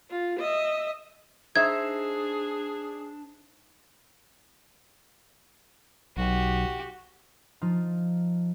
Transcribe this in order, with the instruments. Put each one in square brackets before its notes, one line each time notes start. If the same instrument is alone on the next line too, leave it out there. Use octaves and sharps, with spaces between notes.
[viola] F4
D#5 E5
[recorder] D4 [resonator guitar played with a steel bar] D#4 C5 E5 [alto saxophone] G#4 [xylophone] G#6
[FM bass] B1 [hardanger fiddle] F#4 G4
[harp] F3 D#4 F4